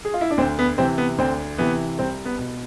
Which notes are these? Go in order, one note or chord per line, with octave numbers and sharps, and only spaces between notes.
G#4
F4
E4
D4
D2 C4
B3
C3 E3 C4
B3
D2 C4
C3 E3 B3
C2 C4
B3
B2